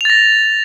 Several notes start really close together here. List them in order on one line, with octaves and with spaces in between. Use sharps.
F7 A6 A#6